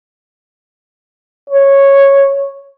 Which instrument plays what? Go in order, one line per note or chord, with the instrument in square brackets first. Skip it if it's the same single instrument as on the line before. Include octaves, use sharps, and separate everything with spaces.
[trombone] C#5